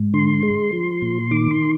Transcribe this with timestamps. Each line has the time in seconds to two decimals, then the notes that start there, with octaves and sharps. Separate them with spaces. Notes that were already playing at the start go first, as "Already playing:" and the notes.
Already playing: G#2
0.14 D3 C6
0.43 G#3
0.73 F3
1.02 A#2
1.31 D#3 D6
1.51 C6